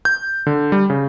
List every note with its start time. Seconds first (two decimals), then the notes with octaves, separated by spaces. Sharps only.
0.05 G6
0.47 D3
0.72 G3
0.90 C#3